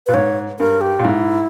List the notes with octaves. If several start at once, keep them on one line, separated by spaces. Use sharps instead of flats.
A#2 B4
G#2 C#5
G2 A#4
G4
A#2
G#2 E4